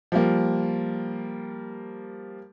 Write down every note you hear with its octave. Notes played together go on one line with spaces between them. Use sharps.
F3 G3 A#3